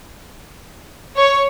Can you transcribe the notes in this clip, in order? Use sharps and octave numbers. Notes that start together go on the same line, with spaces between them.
C#5